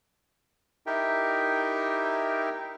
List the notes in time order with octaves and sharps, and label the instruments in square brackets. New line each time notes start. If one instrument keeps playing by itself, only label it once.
[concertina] D#4 E4 G4 A#4 E5 G5